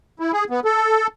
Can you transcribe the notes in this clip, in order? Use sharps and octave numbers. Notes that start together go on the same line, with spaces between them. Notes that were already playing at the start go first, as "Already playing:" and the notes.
E4
G#4
B3
A4